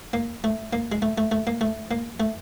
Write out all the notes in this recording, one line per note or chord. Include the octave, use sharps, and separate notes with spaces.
A#3
A3
A#3
G#3
A3
A3
A3
A#3
A3
A#3
A3